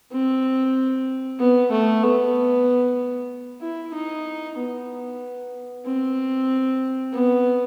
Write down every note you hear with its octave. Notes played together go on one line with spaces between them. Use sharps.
C4
B3
A3
B3
E4
D#4
B3
C4
B3